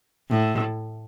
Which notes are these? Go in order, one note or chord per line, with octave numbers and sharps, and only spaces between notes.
A2